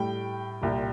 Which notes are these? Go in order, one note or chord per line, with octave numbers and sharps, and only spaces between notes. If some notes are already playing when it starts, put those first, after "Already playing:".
Already playing: A2 G3 G5
C2 A#2 G3